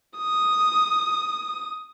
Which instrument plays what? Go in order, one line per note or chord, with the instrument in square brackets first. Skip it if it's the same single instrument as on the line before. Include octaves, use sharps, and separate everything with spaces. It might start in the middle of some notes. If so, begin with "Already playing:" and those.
[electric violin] D#6